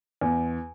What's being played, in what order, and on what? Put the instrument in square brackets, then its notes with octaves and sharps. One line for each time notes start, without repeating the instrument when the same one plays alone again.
[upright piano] E2